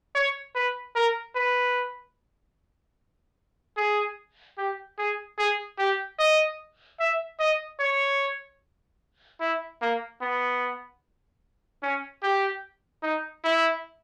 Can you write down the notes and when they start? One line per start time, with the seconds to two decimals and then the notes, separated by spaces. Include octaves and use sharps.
0.15 C#5
0.55 B4
0.95 A#4
1.36 B4
3.77 G#4
4.57 G4
4.98 G#4
5.39 G#4
5.78 G4
6.19 D#5
7.00 E5
7.39 D#5
7.80 C#5
9.40 E4
9.82 A#3
10.21 B3
11.83 C#4
12.23 G4
13.03 D#4
13.44 E4